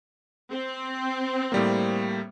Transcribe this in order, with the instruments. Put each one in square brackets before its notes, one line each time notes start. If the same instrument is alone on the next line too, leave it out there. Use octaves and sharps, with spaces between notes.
[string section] C4
[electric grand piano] A2 G3 A#3